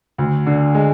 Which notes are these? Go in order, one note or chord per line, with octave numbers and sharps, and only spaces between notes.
D2
D3
G#3